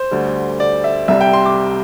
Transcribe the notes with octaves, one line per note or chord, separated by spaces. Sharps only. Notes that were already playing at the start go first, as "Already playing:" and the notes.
Already playing: C5
D2 D3 G3
D5
E5
C2 C3 G3 E5
G5
C6
D6